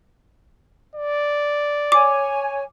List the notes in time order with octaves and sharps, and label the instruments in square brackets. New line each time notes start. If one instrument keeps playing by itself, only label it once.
[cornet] D5
[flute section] C#5 G#5 [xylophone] D6